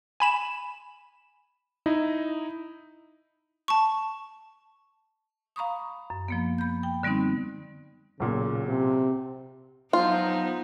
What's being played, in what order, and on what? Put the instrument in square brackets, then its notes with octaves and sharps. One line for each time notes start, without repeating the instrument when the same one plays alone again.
[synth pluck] G#5 B5 E7
[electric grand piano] D#4 E4 D#5
[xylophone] A5 C#6
[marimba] F5 A#5 B5 C#6 D#6
F#2
F3 A#3 B3
B5 G6
G5
D3 G3 B3 C4 D#4
[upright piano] B1 A#2 [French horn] C#3
[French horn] C3
[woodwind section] F3 F#3 C5 [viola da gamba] B3 D#4 [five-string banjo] F4